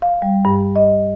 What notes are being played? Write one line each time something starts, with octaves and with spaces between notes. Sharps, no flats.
F5
G3
G2
D#5